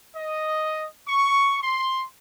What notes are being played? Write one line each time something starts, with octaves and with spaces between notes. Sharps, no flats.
D#5
C#6
C6